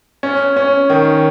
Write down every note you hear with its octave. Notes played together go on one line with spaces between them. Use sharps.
C#4
C#4
D#3